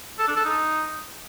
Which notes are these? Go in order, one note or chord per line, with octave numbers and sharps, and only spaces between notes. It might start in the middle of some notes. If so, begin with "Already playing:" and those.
A4
D4
A4
D#4